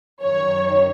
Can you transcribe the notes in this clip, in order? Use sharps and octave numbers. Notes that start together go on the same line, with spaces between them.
F#2 D#3 C#5